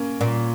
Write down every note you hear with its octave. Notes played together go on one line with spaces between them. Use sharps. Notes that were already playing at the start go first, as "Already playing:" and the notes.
Already playing: A#3 C#4
A#2